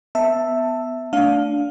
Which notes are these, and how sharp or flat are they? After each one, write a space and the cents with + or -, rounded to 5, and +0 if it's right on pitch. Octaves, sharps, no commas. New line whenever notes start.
B3 +15 E5 +0 A5 +15
A3 +20 D4 -15 F5 +15